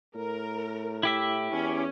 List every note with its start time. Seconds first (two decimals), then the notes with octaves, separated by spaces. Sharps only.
0.15 A2 A#4
1.03 E4 G4 E5
1.52 E2 C#4